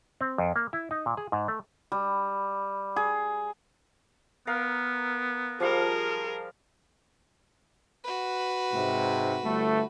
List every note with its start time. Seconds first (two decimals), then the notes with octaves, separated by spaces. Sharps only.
0.21 C4
0.38 F2
0.56 A#3
0.73 E4
0.91 D#4
1.06 A#2
1.17 G#4
1.32 G#2
1.48 A3
1.92 G3
2.96 G#4
4.47 B3 A#4 F5
5.60 F3 G3 G#4 A#4 F5
8.04 F#4 B4
8.74 G#2 C3
9.44 G1 A3